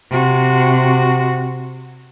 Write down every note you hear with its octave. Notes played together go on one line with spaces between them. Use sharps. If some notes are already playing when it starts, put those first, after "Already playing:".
C3 F#4